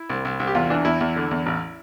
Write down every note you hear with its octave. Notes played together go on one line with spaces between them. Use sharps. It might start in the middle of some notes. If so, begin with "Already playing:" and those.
Already playing: E4
C2
C2
C2
G4
E2 F4
E3 D4
E2 E4
E2
D3
E2
A1